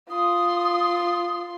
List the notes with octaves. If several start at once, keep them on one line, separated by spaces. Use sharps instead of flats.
F4 C6 D#6